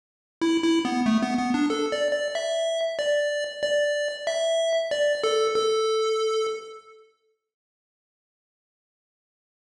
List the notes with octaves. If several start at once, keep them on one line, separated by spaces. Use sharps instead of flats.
E4
E4
B3
A3
B3
B3
D4
A4
D5
D5
E5
D5
D5
E5
D5
A4
A4